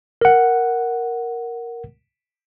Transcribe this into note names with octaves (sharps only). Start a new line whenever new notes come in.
A#4 F#5